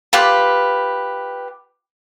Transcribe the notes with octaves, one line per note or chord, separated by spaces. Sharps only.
F4 G4 B4